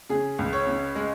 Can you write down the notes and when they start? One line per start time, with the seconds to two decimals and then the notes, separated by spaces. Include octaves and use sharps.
0.10 C#3 G#4
0.39 C#2
0.53 C#5
0.67 C#3
0.96 G#3